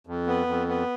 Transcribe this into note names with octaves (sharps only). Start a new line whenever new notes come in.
F2
B3
F2
B3